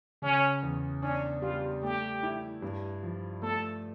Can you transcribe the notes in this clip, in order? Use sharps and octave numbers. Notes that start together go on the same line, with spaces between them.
C#3 C#4
E2
C#4 D4
G3 F4
A3 G4
E4
G2
F3
A3 A4